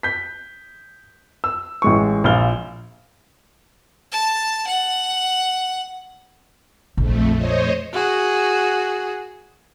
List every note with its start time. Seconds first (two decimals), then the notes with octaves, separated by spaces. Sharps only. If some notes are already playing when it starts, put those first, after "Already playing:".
0.03 G6 B6
1.44 E6
1.82 A1 G#3 C#6
2.24 A#1 F4 F6 G7
4.12 A5
4.67 F#5
6.97 A#1 F2 A3
7.36 C5 C#5 D#5
7.93 F#4 G#4